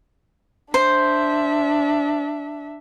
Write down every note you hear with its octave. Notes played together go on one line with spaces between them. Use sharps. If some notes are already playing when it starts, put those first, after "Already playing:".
D4 C5 E5